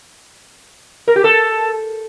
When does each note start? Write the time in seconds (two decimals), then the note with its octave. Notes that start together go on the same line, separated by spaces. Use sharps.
1.08 A#4
1.16 G4
1.24 A4